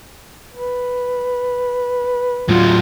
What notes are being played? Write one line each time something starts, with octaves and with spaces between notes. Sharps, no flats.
B4
A2 F#3 F4